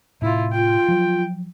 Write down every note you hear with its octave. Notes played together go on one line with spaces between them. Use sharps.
A2 C3 E4 F4
F4 G5
F3 F#3